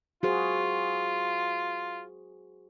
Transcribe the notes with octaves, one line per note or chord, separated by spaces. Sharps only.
F4 F#4 G#4 C5